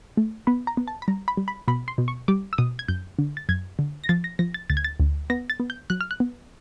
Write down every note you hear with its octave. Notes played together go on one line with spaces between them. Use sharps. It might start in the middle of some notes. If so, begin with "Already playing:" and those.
A3
B3 B5
A#5
B3
A5
B5
G3 A#5
B5
G3
B5
B2 B5
C6
B2
C#6
G3 D6
E6
B2 D#6
G#6
F#2 G6
D3
A6
F#2 G#6
D3
A#6
F3 A6
A#6
F3 A#6
A6
D2 A6
G#6
A6
D2
B3 A#6
A6
B3
G6
F#3 F#6
F6
F#6
B3